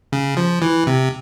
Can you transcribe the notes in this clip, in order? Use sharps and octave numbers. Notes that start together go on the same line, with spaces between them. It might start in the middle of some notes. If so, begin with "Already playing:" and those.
C#3
F3
E3
C3